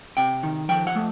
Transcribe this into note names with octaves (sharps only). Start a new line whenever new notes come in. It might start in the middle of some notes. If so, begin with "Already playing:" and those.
C3 G5
D#3
F3 G5
F#5
A3